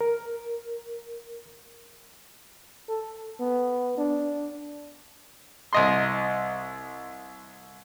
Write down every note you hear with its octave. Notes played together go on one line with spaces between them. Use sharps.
A#4
A4
B3
D4
C2 D#5 C6